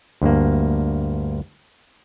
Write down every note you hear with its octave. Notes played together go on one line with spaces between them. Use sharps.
D2 G2 A#3